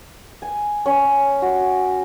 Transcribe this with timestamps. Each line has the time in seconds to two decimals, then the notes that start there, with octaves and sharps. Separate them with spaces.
0.42 G#5
0.86 C#4
1.42 F#4